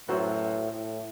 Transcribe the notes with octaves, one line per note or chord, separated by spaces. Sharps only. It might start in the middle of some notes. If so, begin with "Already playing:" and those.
F#2 A2 F#3 B3 F#4 C5
A2